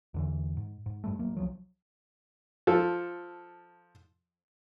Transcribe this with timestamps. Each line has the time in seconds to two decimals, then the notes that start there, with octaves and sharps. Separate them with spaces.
0.14 E2 D3 E3
0.57 G#2
0.86 G#2
1.04 G2 G3 A3
1.19 D1 F#3 A#3
1.37 C2 F3 F#3
2.67 F3 A4